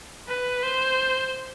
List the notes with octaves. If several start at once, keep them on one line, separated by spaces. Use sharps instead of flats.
B4
C5